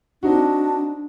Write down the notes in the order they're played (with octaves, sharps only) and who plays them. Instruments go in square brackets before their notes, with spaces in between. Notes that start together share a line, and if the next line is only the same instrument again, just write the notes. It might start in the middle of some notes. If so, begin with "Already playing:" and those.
[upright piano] C4 D#4 F#4 [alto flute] D4